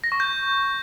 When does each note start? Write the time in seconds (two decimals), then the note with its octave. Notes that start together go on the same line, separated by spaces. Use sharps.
0.04 A#6
0.12 C#6
0.20 G6